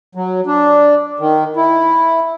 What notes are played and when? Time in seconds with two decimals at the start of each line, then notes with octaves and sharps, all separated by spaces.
0.15 F#3
0.46 D4
1.20 D#3
1.56 E4